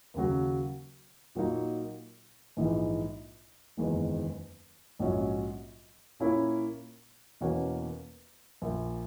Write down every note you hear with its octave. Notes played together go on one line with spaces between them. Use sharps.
D#2 C#3 F#3
A#2 F#3 A#3 D#4
A#1 G#2 E3 G#3 D#4
F#1 E2 D#3 G#3
A#1 G#2 F#3 C#4
A#2 A#3 C#4 E4
E2 B2 A#3 C#4 F#4
A#1 A#2 A#3